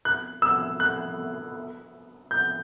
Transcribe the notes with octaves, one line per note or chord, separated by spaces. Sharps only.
F#6
E6
F#6
G6